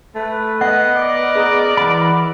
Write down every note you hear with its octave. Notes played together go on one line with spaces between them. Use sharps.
A3 B4
B3 D#5 F#5
A#4 D5
G#4 A#5 D#6
E3 F#5 B5